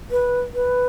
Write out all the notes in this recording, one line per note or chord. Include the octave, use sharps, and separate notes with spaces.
B4
B4